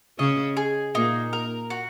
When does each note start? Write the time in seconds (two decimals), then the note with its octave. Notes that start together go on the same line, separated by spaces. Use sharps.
0.19 C#3 C#4 D#5
0.57 G#4
0.95 A#2 A#3 D#4
1.33 A#4
1.70 F#4